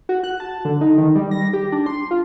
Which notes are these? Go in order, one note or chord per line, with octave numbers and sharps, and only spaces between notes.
F#4
F#6
A5
D3
D#4
D#3
G3
A#6
G4
D4
C6
F4